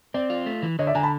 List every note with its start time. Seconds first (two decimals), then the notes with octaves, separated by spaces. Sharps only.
0.14 C4 D5
0.30 F4
0.46 A3
0.63 E3
0.79 D3 C#5 D#5
0.87 D5 E5
0.95 D3 G#5 A#5
1.03 A5 B5